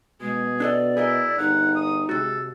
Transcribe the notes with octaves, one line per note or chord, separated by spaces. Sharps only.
B2 G#3 G#4
D4 A4 D5 D#5
E4 G#4 A#4 D#5
G1 D#4 F#5
D#6
C3 G#3 F#4 A4